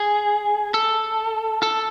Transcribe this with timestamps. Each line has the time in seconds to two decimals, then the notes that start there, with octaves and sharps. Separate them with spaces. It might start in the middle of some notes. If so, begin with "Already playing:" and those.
Already playing: G#4
0.74 A4
1.63 A4